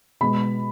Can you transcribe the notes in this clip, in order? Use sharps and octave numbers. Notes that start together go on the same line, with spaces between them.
B2 G#3 B3 B5